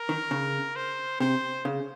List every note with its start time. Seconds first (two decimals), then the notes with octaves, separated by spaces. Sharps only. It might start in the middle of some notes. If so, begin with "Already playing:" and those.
Already playing: A#4
0.09 D#3
0.31 C#3
0.76 C5
1.20 C3 C5
1.65 C#3